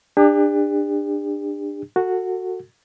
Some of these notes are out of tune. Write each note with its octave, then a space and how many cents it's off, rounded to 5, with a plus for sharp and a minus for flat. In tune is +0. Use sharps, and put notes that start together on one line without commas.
D4 +20 G4 +45
F#4 -5 A4 +30